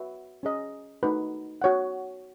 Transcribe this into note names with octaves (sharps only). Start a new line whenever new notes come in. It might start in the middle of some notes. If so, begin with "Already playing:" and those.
Already playing: F#4 B4 E5
C#4 G#4 D#5
A3 D#4 F#4 B4
F#4 C#5 F#5